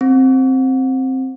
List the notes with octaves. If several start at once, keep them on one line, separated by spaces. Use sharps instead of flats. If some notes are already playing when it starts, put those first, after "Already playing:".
C4